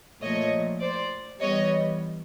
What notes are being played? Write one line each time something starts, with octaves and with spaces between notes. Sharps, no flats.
A#2 F3 A3 C#5 D#5
C5 D5
E3 G3 B3 C#5 D#5